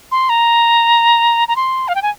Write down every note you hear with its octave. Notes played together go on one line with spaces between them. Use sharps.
C6
A#5
A#5
C6
F5
G5
G#5